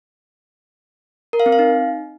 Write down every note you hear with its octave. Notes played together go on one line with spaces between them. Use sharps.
A#4
F5
C4
F5
D#4